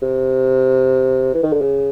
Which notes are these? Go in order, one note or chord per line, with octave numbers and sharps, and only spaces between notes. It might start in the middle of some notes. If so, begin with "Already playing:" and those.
C3
E3
D#3
D3
C#3